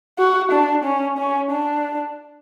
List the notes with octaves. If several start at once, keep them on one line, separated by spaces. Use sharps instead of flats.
F#4
D4
C#4
C#4
D4